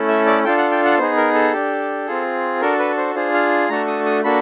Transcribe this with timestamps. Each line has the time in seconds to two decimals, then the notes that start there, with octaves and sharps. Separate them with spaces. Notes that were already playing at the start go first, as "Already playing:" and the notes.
Already playing: A3 C#4 E4 A4
0.08 E5
0.26 D5
0.44 D4 F4 A4 G5
0.58 F#5
0.71 G5
0.85 F#5
0.98 B3 D#4 G#4 C5
1.17 A#4
1.34 A4
1.53 D4 G4
2.07 C4 F4 G#4
2.61 D4 F#4 A4 A#4
2.79 B4
2.97 C5
3.15 D4 F4 G#4 C5
3.34 F5
3.69 A3 D4 F#4 A4 A#5
3.87 D#6
4.06 D#6
4.24 A#3 D4 F#4 A4 B5